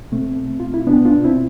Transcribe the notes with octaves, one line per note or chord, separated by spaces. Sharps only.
B2 A3 C4
B2
F4
E4
B2 B3 D4
D4 F4
B2 C4 E4